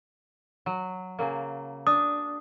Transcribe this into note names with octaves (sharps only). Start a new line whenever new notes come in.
F#3
C#3 F#3 A#3
D4 D#6